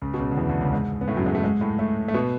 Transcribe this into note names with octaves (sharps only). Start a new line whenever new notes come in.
C#2 C#3
B2
C#2 C#3
D3
E2 E3
D2 D3
C#2 C#3
G#2 G#3
B3
A2 A3
F#2 F#3
G#2 G#3
A2 A3
G#2 G#3
A2 A3
A2 A3
A3
B2 B3